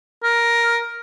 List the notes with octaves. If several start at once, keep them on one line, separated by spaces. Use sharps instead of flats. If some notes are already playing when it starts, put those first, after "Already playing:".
A#4